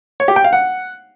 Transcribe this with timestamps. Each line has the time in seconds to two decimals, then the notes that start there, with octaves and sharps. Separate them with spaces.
0.20 C#5
0.28 G4
0.36 G5
0.44 F5
0.53 F#5